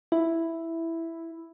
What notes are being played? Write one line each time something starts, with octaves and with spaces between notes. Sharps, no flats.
E4